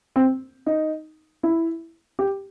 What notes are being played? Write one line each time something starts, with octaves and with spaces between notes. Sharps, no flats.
C4
D#4
E4
G4